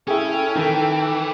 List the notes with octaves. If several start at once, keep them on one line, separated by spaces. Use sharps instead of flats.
C#4 E4 G#4 A4 G5
D#3 E3